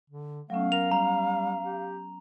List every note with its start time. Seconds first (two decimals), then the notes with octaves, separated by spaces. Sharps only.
0.10 D3
0.50 F#3 A3 B3 C#4 F5
0.72 A#4 F7
0.91 G3 A#5
1.65 G4